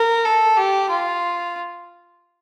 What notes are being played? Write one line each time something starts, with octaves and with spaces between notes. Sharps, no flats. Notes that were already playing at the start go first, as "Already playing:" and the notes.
Already playing: A#4
A4
G4
F4